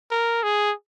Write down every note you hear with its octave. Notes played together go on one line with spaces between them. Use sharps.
A#4
G#4